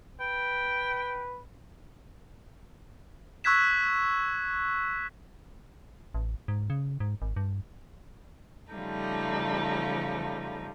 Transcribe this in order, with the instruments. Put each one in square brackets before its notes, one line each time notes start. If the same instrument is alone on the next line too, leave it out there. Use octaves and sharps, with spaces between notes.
[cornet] B4 [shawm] G5
[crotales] C#6 E6 F#6 G#6 B6 E7
[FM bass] A1
G#2
C#3
G#2
G#1
G2
[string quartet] C#3 F3 G3 A3 D#4